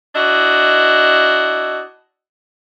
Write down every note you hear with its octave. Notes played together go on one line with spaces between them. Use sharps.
D4 E4 F#4 D#5